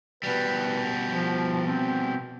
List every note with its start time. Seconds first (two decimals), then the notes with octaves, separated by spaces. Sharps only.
0.23 B2 G3 B4
1.09 F3
1.67 C4